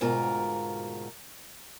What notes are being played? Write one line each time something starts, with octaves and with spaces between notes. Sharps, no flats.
D2 G#2 B2 F4 A#4